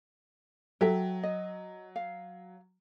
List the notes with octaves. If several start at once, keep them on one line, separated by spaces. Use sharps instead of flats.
F#3 A4 E5 G5
D#5
F5